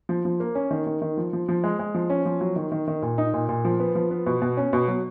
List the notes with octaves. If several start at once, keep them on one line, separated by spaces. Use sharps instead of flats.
F3
F3
A#3
C#4
D#3
D#3
D#3
F3
F3
F3
G#3
G#3
F3
C#4
F3
F#3
D#3
D#3
D#3
A#2
D#4
A#2
A#2
F3
B3
F3
B3
B2
B2
C#4
B2
F#3